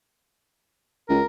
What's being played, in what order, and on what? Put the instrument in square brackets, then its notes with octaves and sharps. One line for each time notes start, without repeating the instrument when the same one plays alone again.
[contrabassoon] C#2 [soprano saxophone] A#4